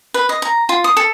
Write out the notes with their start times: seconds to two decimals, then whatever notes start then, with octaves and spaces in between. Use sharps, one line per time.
0.14 B4
0.29 D#5
0.42 A#5
0.69 F4
0.84 D#6
0.97 A4